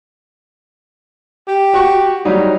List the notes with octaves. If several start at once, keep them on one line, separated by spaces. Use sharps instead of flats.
G4
F#4 C#6
F#3 G3 D#4